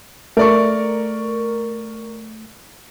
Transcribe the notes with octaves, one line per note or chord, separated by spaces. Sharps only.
A3 A#4 D5 C#6